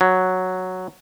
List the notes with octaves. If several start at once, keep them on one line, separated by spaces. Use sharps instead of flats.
F#3